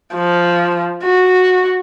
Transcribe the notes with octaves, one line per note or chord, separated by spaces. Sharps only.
F3
F#4